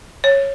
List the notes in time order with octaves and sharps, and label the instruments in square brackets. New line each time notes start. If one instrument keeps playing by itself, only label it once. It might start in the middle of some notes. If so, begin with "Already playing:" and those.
[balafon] C#5